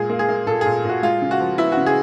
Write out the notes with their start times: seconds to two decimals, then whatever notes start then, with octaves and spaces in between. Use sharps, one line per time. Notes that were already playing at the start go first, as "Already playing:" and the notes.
Already playing: A#2 G#3 G#4
0.10 A#3
0.19 G#4
0.29 A#3
0.47 A#2 A4
0.61 A#2 G#4
0.85 A#2 F#4
1.03 G#3 F4
1.22 C#3
1.31 F#4
1.40 F3
1.58 B3 E4
1.72 C#3 F#4
1.86 G#4